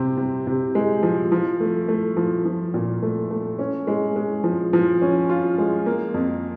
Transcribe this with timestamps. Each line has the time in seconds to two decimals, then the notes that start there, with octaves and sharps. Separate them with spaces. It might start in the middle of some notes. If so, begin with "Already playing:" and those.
Already playing: C3 C4
0.17 C3
0.47 C3
0.75 G#3
1.03 F3
1.32 F3
1.60 A3
1.88 A3
2.17 F3
2.45 F3
2.74 A#2
3.02 A3
3.31 A3
3.59 C#4
3.87 G#3
4.16 G#3
4.44 F3
4.73 F3
5.02 C#4
5.29 F4
5.58 G#3
5.86 A#3
6.14 F2